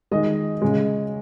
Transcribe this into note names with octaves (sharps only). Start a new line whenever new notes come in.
D#3 G#3 D#5
C#3 G#3